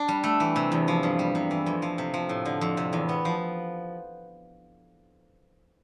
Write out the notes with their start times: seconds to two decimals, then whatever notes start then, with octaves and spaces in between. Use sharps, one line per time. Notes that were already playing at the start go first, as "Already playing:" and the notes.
Already playing: D4
0.08 G3
0.24 A3
0.40 E3
0.56 C3
0.72 E2
0.88 F3
1.03 G2
1.19 G3
1.35 C3
1.51 E3
1.66 F2
1.82 F3
1.98 C3
2.14 F3
2.29 A2
2.46 D3
2.61 F2
2.77 C3
2.93 E2
3.09 B3
3.25 F3